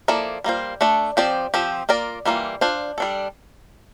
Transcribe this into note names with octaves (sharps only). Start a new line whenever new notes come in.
F3 A#3 E4 A4 D5
G3 A#3 F4 C5
A3 D4 A4 D5
F3 C4 G4 D5
F3 C4 G4
A#3 F4 A#4 D5
E3 G3 A#3 F4
D4 F4 C5
G3 D4 A4